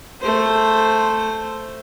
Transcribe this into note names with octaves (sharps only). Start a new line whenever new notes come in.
A3 C5